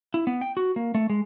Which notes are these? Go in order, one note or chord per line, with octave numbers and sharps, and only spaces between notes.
E4
B3
G5
F#4
A#3
A3
G#3